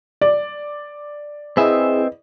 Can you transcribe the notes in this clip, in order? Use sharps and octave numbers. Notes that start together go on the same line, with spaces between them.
D5
C4 E4 G#4 B4 D#5 E5